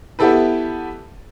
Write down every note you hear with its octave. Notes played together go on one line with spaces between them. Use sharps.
B3 E4 G4 A4 B4